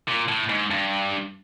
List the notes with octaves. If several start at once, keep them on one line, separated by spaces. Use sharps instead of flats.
A#2
A2
G#2
G2